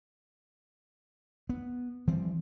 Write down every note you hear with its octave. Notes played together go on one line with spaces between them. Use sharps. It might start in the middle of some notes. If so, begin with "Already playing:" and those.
B3
E3 F3 G3 C4